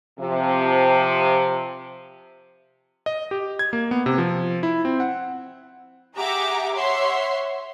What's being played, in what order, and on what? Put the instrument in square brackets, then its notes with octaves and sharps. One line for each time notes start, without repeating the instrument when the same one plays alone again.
[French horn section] C3 F3
[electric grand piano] D#5
G4
G#6
A#3
B3
C3
F3
E4
C4
F#5
[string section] G4 G#4 E5 F#5 A#5 D6
C#5 E5 F#5 C6